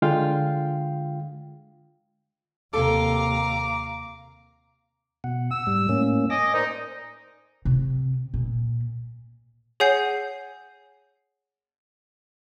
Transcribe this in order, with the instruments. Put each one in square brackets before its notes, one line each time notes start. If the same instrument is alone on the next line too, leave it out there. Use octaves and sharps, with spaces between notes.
[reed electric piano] D3 G#3 F4 F5 G5
[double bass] D#2 C3 [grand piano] A4 [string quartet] F5 A#5 [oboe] D6
[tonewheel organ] B2 F#5
[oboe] E6
[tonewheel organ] G#2 G3
A2 A#3 C#4
[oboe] D#5 [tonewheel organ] G#5 D6 A#6
[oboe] D#4 [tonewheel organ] A#4 C5 D5
[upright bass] C3
A#2
[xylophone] G#4 C#5 F#5 G#5 G6 C7